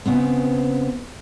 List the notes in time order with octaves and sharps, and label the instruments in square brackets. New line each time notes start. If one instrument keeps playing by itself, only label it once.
[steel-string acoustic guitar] C#3 B3 C4